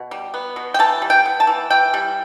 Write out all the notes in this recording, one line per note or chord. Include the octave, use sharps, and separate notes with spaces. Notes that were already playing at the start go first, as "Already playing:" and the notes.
Already playing: B2
G3
B3
B2
G5
E3 A5
G3
G5
B3
A5
E3
E3 G5
G3